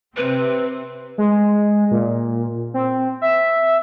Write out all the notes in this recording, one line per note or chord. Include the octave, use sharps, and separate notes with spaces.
C3 C4 B4
G#3
A#2
C4
E5